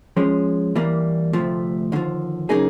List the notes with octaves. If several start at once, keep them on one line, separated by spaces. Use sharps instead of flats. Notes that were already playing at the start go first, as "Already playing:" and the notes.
F3 G#3 C#4
E3 G3 A#3
D2 C3 F3 A3
D#2 D3 F3
C#3 F#3 A#3 D#4 G#4